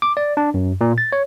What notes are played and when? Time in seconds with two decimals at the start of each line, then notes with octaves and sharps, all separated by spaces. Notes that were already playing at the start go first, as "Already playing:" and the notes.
0.02 D6
0.17 D5
0.37 D4
0.54 F#2
0.81 A#2
0.98 A6
1.12 C#5